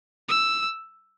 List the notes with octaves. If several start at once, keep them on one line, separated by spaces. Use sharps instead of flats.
E6